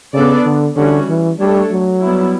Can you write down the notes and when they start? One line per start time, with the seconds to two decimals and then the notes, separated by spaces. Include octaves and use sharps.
0.14 C#3 B3 D4 A4 D5
0.46 D3
0.77 D3 E3 G3 C#4 F#4
1.09 E3
1.40 G3 A3 D4 A4 C#5
1.72 F#3
2.03 G3 B3 E4